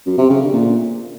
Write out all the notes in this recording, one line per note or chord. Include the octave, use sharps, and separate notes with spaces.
F#2
C3
C#3
D3
A#2